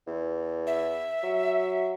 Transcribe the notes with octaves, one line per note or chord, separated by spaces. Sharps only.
E2
E5
F#3